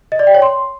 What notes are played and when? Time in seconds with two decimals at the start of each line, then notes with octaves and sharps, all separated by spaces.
0.12 D#5
0.19 D5
0.27 G5
0.35 C#5
0.42 C6